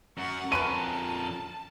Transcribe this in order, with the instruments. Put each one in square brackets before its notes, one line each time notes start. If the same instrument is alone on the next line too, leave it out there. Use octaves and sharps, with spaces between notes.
[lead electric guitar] F#2 [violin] F#5 C#6
[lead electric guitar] F2 A#4 [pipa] D3 C#4 B4 [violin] A5 [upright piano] D#7